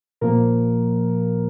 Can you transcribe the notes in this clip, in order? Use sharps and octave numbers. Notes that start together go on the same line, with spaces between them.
A#2 F3 A#3 A#4